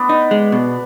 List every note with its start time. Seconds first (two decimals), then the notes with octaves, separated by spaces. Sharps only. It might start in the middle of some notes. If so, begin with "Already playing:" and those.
Already playing: B3 D4 B4 D5
0.09 D#4
0.31 G#3
0.52 B2